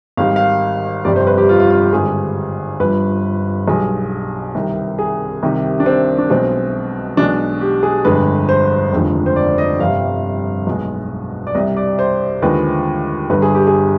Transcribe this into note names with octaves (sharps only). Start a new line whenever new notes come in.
G#1 G#2 D#3 G3 F5
F5
G1 F2 C3 G3 D5
C5
B4
G4
F4
F4
F4
G4
G#1 G2 D3 G#4
G1 G2 F3 B4
B1 B2 G3 G#4
C2 C3 D#3
G#4
C2 C3 D#3 G3
D4
C4
D4
B1 B2 G#3 C4
B1 B2 G#3 D4
G4
G#4
G1 F2 D3 G#3 B4
C5
F1 D#2 D3 F3 G#3
C5
D5
D#5
G1 F2 C3 G3 F5
B1 B2 G#3
D5
C2 C3 G3 D#5
D5
C5
D#2 D3 F3 G#3 B4
G1 G2 D3 B4
G#4
G4
G#4